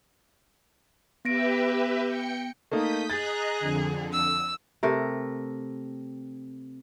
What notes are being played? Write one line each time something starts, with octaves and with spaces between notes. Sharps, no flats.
B3 G4 B4 E5 A#6 D7
G5 C#7
A3 A#3 D#4 D#6 G6 B6
G#4 D#5 A#5 F#6 A6
F2 D3
E6
C3 A3 A#4